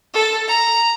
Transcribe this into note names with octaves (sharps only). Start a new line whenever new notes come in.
A4
A#5